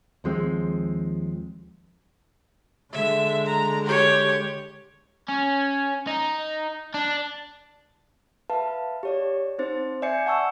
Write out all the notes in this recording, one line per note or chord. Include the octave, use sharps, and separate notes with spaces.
D#2 F3 G#3 C4
D3 G#3 E5
A#5
G4 C#5
C#4
D#4
D4
B4 E5 F5 A5
G4 C#5 D5
C4 D#4 C5 A6
D5 E5 G#5 G6 C7 C#7
F#5 A5 C#6 E6